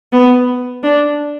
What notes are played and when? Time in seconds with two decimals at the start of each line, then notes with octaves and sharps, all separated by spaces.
0.13 B3
0.83 D4